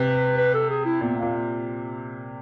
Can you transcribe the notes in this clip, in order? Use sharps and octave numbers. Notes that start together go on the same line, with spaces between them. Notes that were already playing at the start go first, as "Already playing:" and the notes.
Already playing: C3 B4
B4
A4
G#4
E4
A#2 B3
A#3
A#2